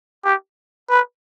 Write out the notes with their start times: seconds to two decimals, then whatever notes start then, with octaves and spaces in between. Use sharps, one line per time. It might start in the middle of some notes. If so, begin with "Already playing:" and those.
0.25 G4
0.90 B4